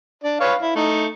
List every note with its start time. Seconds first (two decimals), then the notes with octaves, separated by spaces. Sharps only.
0.23 D4 D5
0.40 B4 C#5 F5
0.62 E4
0.75 A3 D#4